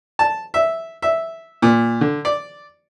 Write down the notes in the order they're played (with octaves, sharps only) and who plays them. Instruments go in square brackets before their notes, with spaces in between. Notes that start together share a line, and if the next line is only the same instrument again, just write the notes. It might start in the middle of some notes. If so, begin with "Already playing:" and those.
[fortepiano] A5
E5
E5
A#2
D3
D5